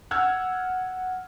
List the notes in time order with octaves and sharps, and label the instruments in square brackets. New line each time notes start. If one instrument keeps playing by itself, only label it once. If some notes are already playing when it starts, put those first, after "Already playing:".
[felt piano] F#5 E6 F6 G#6